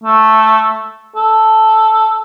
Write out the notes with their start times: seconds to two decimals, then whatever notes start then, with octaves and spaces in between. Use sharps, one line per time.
0.04 A3
1.16 A4